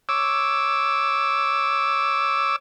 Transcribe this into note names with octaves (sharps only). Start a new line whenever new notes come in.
C#5 D6 E6